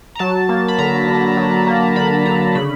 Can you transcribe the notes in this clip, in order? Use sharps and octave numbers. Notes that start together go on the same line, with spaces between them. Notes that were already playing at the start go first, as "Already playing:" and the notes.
A#5
F#3 A5
A#3
B5
D3 A#5
D3
F#3
A#3
D3 B5
D3 A#5
C#3 B5